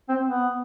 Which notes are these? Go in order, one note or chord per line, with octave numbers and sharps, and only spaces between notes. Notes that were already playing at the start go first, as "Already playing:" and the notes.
C4
B3